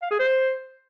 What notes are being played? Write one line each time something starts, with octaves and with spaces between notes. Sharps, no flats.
F5
G#4
C5